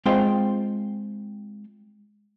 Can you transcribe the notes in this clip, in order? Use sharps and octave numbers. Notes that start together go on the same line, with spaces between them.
G#3 C4 F4 C5 F5 G5